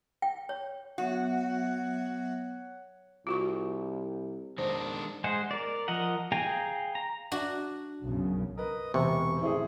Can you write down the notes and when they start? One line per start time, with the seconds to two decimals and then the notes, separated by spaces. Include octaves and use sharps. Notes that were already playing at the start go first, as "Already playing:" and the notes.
0.22 G5
0.49 C#5
0.98 F#3 B3 F#4 C#5 E5 F#5
3.27 C2 F4 F#4 C#6
4.58 D#3 G#3 D4 C5
5.24 G#3 G#4 C5 F#5
5.51 A#4 D5
5.88 F3 A#4 D#5 F#5
6.32 G#4 F5 G5 G#5 A#5
6.95 A#5
7.32 D4 F#4
8.05 B1 F#2 C#3
8.58 A#4 B4 D#5
8.94 E1 C3 C#6
9.41 A1 A2 E3 C4 G#4